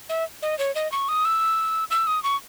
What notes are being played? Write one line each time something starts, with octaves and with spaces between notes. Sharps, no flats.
E5
D#5
C#5
D#5
C#6
D#6
E6
E6
D#6
C#6